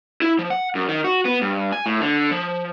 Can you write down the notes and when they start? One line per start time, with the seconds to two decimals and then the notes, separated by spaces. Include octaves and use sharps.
0.22 E4
0.39 F3
0.50 F#5
0.75 F#2
0.89 D#3
1.04 F#4
1.25 B3
1.41 G2
1.72 G#5
1.86 A2
2.01 D3
2.31 F3